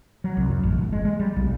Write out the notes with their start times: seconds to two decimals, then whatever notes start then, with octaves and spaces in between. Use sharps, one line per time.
0.24 F#3
0.37 C2
0.49 F#2
0.63 A1
0.78 G1
0.92 G#3
1.05 G#3
1.20 G3
1.36 B1